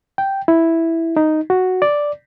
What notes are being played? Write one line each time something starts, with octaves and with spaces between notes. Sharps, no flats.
G5
E4
D#4
F#4
D5